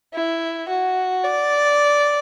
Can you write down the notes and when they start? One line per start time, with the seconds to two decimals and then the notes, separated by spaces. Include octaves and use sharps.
0.14 E4
0.68 F#4
1.24 D5